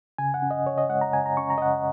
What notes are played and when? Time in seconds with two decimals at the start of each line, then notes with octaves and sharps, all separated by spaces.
0.18 C#3 G#5
0.34 F#5
0.42 C#4
0.51 D#5
0.67 C#3 C#5
0.78 D#5
0.90 G#3 F#5
1.01 A#5
1.13 C#3 G#5
1.26 A#5
1.37 C#4 C#6
1.50 A#5
1.58 D#5
1.61 C#3 F#5